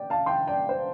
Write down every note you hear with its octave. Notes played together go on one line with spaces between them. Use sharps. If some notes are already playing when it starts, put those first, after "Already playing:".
Already playing: D5 G5
F5 A5
G5 C6
D5 G5
C5